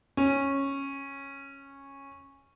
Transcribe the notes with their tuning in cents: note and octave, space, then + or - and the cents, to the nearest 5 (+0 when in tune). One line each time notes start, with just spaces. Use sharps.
C#4 -10